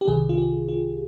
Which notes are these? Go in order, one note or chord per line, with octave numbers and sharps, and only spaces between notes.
G4
C2 C3 D#3 G#4
F4
G4
F4